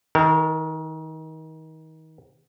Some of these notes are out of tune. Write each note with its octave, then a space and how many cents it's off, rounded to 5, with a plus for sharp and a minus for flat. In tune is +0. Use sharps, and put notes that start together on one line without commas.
D#3 +30 A#4 -30